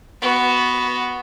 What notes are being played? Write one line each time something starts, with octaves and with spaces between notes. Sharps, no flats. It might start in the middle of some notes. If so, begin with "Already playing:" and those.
B3 F#4